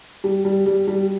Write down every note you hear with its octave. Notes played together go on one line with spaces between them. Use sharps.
G3
G3
G3
G3